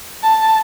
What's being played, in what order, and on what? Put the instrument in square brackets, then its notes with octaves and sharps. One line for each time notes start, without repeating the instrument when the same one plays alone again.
[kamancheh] A5